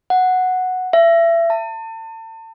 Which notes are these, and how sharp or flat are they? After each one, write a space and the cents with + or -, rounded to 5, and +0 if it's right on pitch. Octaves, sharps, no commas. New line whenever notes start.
F#5 -5
E5 +30
A5 +35